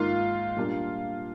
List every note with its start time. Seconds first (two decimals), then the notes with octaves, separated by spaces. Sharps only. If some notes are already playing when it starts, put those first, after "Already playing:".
Already playing: G#2 D#3 A#3 D#4 F4
0.56 A#2 G3 A#3 D4